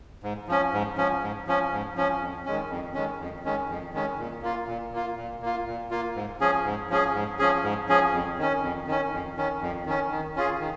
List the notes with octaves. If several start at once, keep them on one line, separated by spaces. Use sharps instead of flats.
G#2
F3 C#4
G#2
F3 C#4
G#2
F3 C#4
G#2
F3 C#4
F2
D#3 G#3 C#4
F2
D#3 G#3 C#4
F2
D#3 G#3 C#4
F2
D#3 G#3 C#4
A#2
A#3 F4
A#2
A#3 F4
A#2
A#3 F4
A#2
A#3 F4
G#2
F3 C#4 G#4
G#2
F3 C#4 G#4
G#2
F3 C#4 G#4
G#2
F3 C#4 G#4
F2
D#3 C#4
F2
D#3 C#4
F2
D#3 C#4
F2
D#3 C#4
D#3
C#4 F4 G#4
D#3